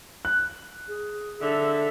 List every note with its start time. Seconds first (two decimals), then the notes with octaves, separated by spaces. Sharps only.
0.25 F#6
0.88 G#4
1.42 D3 A4 E5